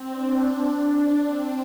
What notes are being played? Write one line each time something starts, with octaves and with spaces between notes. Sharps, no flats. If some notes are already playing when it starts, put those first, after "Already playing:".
Already playing: C4
D4
C4